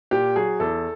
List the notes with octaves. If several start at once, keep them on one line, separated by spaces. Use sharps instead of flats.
A#2 G4
F#3 G#4
E2 A4